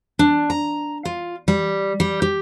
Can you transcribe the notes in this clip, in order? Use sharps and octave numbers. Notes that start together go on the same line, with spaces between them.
D4
A#5
F4
G3
G3
G4